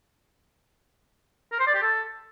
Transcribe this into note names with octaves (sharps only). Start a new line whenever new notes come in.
A#4
C5
D5
G4
A4